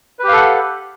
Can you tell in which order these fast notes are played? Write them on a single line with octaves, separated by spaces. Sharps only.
B4 G4 F5 A4 F#5